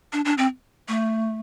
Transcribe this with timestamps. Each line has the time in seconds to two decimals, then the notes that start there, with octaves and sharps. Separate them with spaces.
0.13 D4
0.25 D4
0.38 C4
0.88 A3